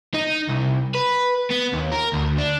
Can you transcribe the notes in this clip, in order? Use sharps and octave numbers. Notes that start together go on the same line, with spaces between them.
D#4
C2
B4
B3
D#2
A#4
D2
D4